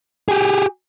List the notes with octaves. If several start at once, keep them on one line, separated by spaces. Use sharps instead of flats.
G4 G#4